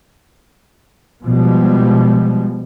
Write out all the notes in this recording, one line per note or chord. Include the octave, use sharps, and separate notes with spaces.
B2 F3 G3 G#3